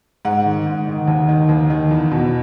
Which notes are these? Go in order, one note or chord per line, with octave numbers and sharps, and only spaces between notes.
G#2 F#5
D#3
G#2
D#3
D#2
D#3
D#2
D#3
E2
B2